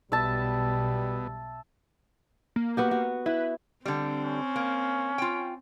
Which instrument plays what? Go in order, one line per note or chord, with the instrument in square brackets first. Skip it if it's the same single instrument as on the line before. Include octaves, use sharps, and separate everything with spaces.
[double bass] B1 [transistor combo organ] B2 [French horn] G3 [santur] E5 A5
[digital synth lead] A#3
[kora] B3 F#4 G4
F#4
[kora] E4 [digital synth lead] B4
[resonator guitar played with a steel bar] D3 G3 [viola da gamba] C4
[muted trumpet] C#4
[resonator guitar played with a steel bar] A#3
F4 G5